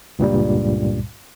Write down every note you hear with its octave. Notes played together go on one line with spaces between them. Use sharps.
C#2 G2 A#2 G3